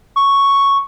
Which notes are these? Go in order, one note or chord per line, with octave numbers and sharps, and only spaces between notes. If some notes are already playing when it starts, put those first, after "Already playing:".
C#6